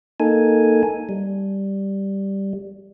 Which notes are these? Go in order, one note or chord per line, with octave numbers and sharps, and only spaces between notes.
A#3 D#4 A4 G#5
G3